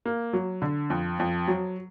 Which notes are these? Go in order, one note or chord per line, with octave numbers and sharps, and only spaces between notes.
A#3
F#3
D3
F2
F2
F#3